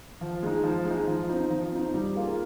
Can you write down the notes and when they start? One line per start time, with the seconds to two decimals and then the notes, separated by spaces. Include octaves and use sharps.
0.21 F3
0.43 G#3 D#4
0.63 F3
0.85 G#3 D#4
1.08 F3
1.29 C4 D#4
1.50 F3
1.72 C4 D#4
1.94 G3
2.15 A#3 F4 G#4